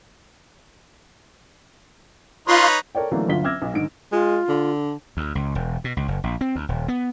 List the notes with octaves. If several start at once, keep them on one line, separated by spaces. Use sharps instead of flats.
D#4 F4 B4 C#5 C6
A4 A#4 C#5 D5 G5
D3 E3 F#3 A3 A#3 D4
G1 D2 F#3 F4 B6 G7
E5 D6 E6 F6 G#6 A#6
B1
G#2 D3 D#3 D7
G#3 F4
D3
D2
C#2
E1
B2
C#2
F#1
A#1
C4
D2
D#1
B3